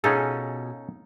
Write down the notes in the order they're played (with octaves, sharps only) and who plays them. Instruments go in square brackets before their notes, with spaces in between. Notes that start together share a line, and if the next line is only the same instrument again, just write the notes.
[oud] B2 F4 G#4 [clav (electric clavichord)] C#4 D#4 A4